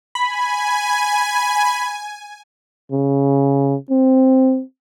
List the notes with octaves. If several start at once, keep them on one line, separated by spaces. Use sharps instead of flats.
G#5 B5
C#3
C4